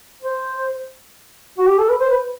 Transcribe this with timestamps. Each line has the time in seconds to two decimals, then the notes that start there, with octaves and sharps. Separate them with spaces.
0.23 C5
1.58 F#4
1.68 G4
1.79 A4
1.89 B4
2.01 C5
2.10 B4